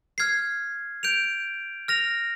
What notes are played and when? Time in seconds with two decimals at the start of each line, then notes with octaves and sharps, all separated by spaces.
0.18 F6 G#6 C7
1.03 G6 D7 F7
1.88 F6 A#6 F7